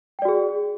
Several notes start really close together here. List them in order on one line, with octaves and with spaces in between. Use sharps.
G5 D5 F#4 G#4